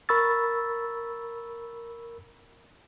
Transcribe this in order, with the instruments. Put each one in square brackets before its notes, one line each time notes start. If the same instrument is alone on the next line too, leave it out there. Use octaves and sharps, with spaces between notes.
[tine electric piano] A#4 B5 C#6 E6 A6